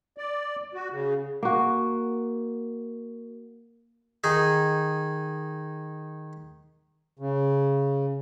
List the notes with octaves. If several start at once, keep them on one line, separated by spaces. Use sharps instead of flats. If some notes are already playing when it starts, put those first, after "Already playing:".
D5
F#4
C#3
A#3 F#4
D#3 D#4 G#4
C#3